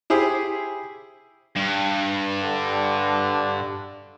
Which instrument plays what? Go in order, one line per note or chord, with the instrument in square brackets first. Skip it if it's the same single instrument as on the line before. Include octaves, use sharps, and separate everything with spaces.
[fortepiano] E4 G4 G#4 C5
[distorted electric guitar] G2
[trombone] D3